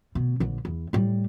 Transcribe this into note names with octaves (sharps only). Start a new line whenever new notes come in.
D2 B2
A#1 D3
E2
A2 G3